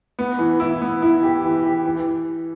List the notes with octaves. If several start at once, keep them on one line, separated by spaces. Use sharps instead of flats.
B3
E3
E4
B3
E4
G4
E3
G4
E3